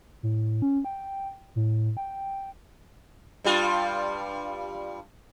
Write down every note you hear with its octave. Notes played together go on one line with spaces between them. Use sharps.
A2
C#4
G5
A2
G5
G2 G3 F4